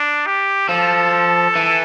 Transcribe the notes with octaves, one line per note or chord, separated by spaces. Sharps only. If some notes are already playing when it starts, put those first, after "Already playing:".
Already playing: D4
G4
F3 A4
E3